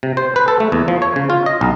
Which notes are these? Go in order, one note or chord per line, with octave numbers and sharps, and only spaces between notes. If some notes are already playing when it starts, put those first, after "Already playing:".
C3
C5
B4
A4
A3
E2
F3
C#5
C#3
F4
D#5
B1